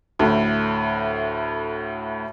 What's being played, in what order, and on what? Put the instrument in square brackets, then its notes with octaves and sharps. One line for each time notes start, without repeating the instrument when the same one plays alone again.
[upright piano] D2 A2